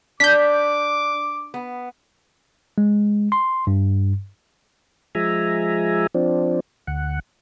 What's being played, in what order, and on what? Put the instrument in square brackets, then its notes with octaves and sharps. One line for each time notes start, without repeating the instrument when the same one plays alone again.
[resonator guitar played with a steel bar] D4 [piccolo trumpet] D6 [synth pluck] G6 B6
[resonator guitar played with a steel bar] B3
[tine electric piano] G#3
C6
G2
[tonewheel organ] F3 G#3 E5 G#5 A#5
F3 C4 D4
D2 F#5